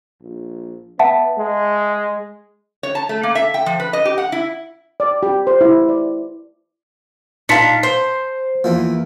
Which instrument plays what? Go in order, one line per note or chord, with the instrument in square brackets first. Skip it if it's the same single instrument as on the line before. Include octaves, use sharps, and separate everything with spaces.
[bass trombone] A#1
[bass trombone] B3 [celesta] E5 F#5 A5
[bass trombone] G#3
[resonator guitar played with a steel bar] C#5
A5
A3
A#3
E5
G5
F3
B4
D#5
G4
F#5
E4
[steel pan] D5
G4
C5
E4
D5
[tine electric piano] A#2 D#4 C6 [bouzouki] D4 F5 [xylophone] A5 B6 C#7
[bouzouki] C5 [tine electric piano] C7
[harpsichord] E2 E3 F3 [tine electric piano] A#3